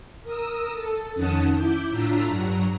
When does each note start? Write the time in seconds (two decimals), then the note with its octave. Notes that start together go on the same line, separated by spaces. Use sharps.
0.24 A#4 D#6 E6
0.73 A4
1.15 F2 D#3 C#4 F#5 A5 D#6
1.54 E4 D6 G6
1.91 A2 D4 F4 A#5 E6 B6
2.28 G2 F#3 A#5